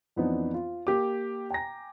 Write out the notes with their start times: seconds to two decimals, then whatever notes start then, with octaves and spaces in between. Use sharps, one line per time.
0.16 F2 E3 B3 C4 D4 D#4
0.54 F4
0.87 A#3 G4 D6
1.50 G5 G#5 A#5 A#6